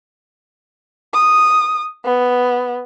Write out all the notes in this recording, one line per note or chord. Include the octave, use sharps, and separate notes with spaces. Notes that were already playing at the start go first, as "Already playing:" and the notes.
D#6
B3